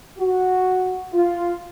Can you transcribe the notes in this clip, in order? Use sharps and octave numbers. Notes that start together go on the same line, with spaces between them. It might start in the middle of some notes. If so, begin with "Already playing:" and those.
F#4
F4